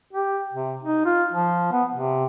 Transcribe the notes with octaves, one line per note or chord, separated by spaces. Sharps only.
G4
C3
D#4
F4
F3
B3
C3